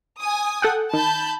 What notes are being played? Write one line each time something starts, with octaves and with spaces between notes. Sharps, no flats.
G#5 D#6
A4 F#5 G5
D#3 A5 B5 G6